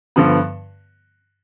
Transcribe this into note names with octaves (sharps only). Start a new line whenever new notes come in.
G2 D3 F3 B3